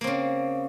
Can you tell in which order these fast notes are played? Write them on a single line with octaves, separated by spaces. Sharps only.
A#3 C4 C#3